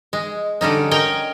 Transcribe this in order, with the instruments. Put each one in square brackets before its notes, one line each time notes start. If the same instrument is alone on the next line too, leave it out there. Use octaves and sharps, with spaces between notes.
[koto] G#3
D3 G3 C#4 D#4
A#4 C#5 D#5 G5 G#5